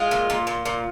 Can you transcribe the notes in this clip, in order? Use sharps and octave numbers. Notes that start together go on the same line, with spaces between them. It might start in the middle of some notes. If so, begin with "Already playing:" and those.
Already playing: G#3 F4
A#2
A#2
A#2
A#2